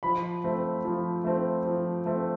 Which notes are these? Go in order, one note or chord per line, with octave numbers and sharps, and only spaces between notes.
F3 B5
A3 C4
F3
A3 C4
F3
A3 C4